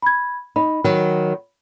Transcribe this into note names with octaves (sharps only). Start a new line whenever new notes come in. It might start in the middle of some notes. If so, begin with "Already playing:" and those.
B5 G#6
D#4 B5
D#3 F#3